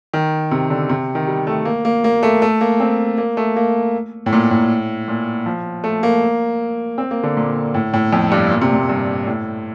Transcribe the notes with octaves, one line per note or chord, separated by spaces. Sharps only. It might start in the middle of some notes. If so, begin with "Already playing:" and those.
D#3
C3
D3
C3
D#3
G3
A3
A#3
A#3
A#3
A3
A3
A#3
C4
A#3
A3
A#3
A2
A#2
A2
A#2
F3
A3
A#3
C4
A#3
D3
A#2
A2
A2
F2
G2
A#2
C3
A#2
G2
A2